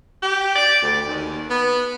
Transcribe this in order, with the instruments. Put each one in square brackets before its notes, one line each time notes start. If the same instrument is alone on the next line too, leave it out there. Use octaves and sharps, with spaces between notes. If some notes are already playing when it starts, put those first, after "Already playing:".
[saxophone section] G4
D5
D2
D#2
B3